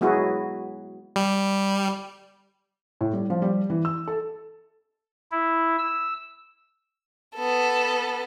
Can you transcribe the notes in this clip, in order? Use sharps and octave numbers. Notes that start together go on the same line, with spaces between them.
F#3 G#3 B3 E4 F#4 G#4
G3
A2
G3
F3
G3
E3
E6
A4
E4
E6
B3 A4